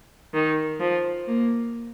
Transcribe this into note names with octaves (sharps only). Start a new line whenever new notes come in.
D#3
F3
A#3